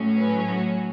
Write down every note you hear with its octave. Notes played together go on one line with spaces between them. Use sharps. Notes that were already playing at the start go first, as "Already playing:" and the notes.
Already playing: A2 F#3 C#4
B4
F#4